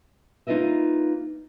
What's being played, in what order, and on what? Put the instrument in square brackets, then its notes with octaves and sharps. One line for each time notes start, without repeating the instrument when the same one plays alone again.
[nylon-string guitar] A#3 D#4 F4 B4 D#5 E5